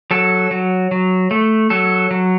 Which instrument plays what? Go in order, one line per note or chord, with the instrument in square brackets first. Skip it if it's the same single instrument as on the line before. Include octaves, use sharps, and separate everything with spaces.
[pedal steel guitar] F#3 A4
F#3
F#3
A3
F#3 A4
F#3